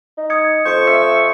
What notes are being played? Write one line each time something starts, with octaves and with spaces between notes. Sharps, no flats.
D#4
D#6 G#6 C#7
F2 C5 C#6 G6 C#7
E5